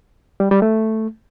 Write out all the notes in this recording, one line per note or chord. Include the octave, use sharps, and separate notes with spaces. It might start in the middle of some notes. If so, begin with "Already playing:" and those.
G3
G3
A3